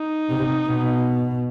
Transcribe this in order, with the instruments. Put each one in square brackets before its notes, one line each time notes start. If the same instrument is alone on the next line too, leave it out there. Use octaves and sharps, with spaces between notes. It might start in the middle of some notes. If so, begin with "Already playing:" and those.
Already playing: [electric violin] D#4
[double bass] C3
B2